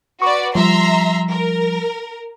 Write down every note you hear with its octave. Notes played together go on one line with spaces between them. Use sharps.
F#4 B4 D5 C#6 D6
F3 G3 E5 A#5 C6
A#4